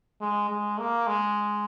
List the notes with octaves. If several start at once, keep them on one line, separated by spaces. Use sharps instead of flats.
G#3
G#3
A#3
G#3